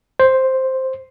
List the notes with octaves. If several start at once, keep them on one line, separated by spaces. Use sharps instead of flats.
C5